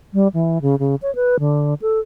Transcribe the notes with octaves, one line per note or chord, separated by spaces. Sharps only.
G3
E3
C#3
C#3
C#5
B4
D3
A4